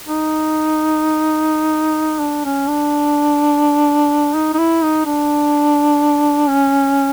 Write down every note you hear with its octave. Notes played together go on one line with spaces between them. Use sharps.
D#4
D4
C#4
D4
D#4
D#4
E4
D#4
D4
C#4